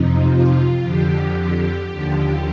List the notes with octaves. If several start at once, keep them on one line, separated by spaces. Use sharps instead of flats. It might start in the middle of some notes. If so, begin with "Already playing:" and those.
Already playing: F2 C3 F3 D#4
F4
F2 D3 F3 G4
G4
D#2 D3 F3